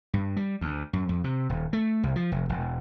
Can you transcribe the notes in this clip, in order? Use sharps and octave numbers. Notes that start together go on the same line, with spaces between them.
G2
G3
D2
F#2
F2
C3
D#1
A3
C2
F3
F1
E1